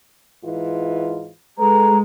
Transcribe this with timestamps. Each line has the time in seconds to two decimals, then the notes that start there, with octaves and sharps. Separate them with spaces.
0.43 G#2 E3 F4
1.59 G#3 A4 B4 A#5